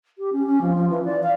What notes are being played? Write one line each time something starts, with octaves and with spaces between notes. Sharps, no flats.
G4
C#4
C#4
F3
F3
E3
D5
F5